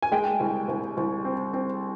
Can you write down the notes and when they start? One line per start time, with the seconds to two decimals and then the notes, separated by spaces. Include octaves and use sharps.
0.02 G#5
0.12 G#3 G5
0.40 C2
0.68 C2
0.97 C2
1.25 C4
1.53 C4